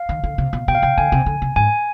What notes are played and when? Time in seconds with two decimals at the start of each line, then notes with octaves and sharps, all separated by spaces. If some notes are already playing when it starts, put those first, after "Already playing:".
Already playing: F5
0.09 D#3
0.24 D3
0.38 C3
0.53 B2
0.68 B2 G5
0.75 F5
0.82 C3 G5
0.98 D3 G#5
1.12 C3
1.26 D3
1.42 C3
1.56 G#2 G#5